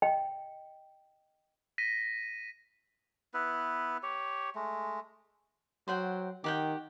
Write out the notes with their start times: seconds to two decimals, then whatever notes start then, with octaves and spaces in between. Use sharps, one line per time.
0.02 D#5 G5
1.78 A#6 B6 D#7
3.34 B3 E4 B4
4.03 G4 C#5
4.55 G#3 A3
5.88 F#3 C5 F#5 G5
6.44 D#3 G4 F#5 G5